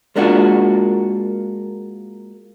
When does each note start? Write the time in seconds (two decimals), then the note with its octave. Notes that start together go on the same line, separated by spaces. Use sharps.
0.16 G#3 A#3 D4 F4 F#4